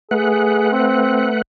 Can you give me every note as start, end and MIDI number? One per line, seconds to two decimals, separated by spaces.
0.11 1.42 57
0.11 0.70 68
0.11 1.42 71
0.11 1.42 78
0.72 1.30 60